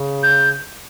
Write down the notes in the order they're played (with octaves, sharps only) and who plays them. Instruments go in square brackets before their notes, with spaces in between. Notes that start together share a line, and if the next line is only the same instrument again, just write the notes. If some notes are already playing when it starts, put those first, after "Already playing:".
Already playing: [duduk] C#3
[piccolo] G6